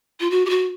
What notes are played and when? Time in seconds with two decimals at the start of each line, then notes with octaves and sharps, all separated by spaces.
0.20 F4
0.30 F#4
0.45 G4
0.50 F#4